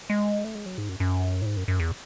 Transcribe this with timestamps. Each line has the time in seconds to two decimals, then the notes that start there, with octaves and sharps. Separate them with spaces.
0.10 G#3
0.44 A3
0.55 G#3
0.66 F#3
0.78 G#2
0.89 F#2
1.00 F#2
1.42 A2
1.46 G#2
1.57 F#2
1.68 F#2
1.80 E2